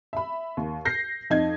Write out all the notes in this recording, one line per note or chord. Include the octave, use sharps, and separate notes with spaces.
E5 B5
D#2
G6 A#6 C7
F2 D#4 G#6